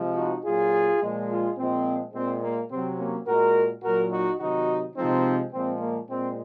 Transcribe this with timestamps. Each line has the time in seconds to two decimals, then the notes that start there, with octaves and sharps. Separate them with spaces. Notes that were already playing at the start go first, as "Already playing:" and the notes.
Already playing: C3 F3 G#3
0.16 D#4 F#4
0.45 A#2 F#3 F4 G#4
1.02 A#2 F3 G#3
1.30 F4 G#4
1.57 A#2 F3 G#3 C4
2.14 A#2 G#3 C4
2.43 A#3
2.71 C3 F#3 C4
2.98 A#3 C#4
3.27 A#2 G#3 F#4 A#4
3.83 A#2 F#3 F#4 A#4
4.12 D#4 F#4
4.40 C3 D#3 F#3 D#4 F#4
4.96 C3 F3 G#3 C4 D#4
5.53 A#2 F3 G#3 C4
5.81 A#3
6.09 A#2 G#3 C4